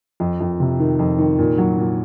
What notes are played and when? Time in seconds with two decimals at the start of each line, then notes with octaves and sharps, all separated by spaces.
0.20 F2
0.40 F2
0.60 C3
0.80 D#3
0.99 F2
1.18 D#3
1.39 A#2
1.58 F#3
1.78 A#2